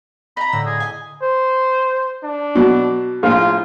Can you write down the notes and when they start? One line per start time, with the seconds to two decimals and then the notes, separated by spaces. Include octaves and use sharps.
0.37 D#4 A#5 B5
0.53 A2 D3 E6
0.66 G#4
0.80 D#5 G#5
1.22 C5
2.24 D4
2.55 B2 F#3
3.23 A#1 A2 F4